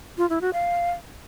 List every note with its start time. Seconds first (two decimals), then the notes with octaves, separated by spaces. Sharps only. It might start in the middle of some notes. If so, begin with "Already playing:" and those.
0.18 F4
0.30 E4
0.41 F#4
0.53 F5